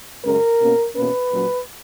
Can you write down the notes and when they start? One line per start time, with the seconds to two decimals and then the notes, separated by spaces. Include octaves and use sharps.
0.24 F#2 C#3 G#3 C#4 A#4
0.60 B2 A#3 C#4
0.95 E2 B2 A#3 C#4 B4
1.31 A#2 F#3 C#4